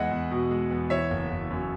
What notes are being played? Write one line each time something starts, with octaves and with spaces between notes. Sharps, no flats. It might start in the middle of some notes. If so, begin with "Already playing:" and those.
Already playing: E2 G#3 D#5 E5 F#5
E2
B2
G#3
E2
E3 C#5 E5
F#1
F#1
F#2